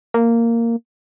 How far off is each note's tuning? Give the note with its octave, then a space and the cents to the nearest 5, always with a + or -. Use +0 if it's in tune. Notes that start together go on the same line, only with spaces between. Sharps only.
A#3 -10